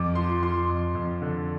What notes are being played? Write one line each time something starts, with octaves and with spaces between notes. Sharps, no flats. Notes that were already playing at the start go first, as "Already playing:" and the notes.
Already playing: F2 D6
F3 C6
F3 C6
F2
F2
D3